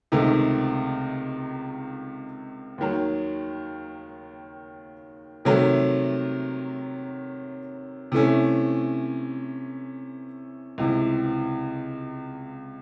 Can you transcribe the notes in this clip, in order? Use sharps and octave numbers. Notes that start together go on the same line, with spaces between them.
C#2 C3 D#3 A3 D#4
D#2 D#3 F#3
C3 D#3 F#3 A3
C3 E3 A3 C#4
C#2 C3 E3